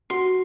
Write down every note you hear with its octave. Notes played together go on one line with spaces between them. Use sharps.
F#4 C6